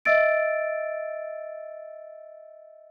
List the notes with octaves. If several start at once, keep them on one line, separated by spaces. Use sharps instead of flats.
D#5 E5 E6 A6 D7